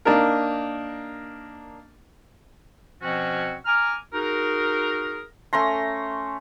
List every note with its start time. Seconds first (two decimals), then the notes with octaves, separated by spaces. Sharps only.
0.05 A#3 D4 D#4 A#4
3.02 B2 F3 C4 C#4 F#4
3.66 G#5 A#5 D6 F6
4.13 D#4 F#4 G#4 A#4
5.53 A3 C#4 A#5 C6